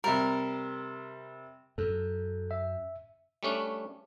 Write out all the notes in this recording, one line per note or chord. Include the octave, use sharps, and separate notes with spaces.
C3 G3 A#4
F#2 A4
E5
G3 A3 C#4 D4